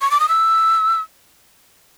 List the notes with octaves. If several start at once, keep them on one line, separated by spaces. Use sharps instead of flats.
C#6
D6
D#6
E6